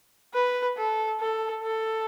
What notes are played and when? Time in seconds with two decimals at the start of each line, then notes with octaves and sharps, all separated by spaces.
0.34 B4
0.77 A4
1.20 A4
1.63 A4